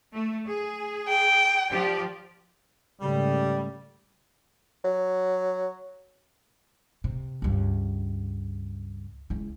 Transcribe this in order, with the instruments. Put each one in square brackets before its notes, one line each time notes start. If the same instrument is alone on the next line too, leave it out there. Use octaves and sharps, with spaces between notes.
[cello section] A3
G#4
[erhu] G5
[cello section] F3 G4 D5
[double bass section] G#2 C#3 A3 [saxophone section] G3
[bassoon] F#3
[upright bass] C3
C#2 G2
C#2 E4